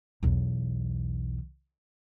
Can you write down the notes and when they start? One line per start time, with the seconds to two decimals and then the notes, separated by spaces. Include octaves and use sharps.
0.23 B1 E2